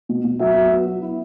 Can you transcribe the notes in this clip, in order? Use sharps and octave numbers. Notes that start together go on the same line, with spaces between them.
B2
B2
F#3 E5
F#3
B3
F#3
E4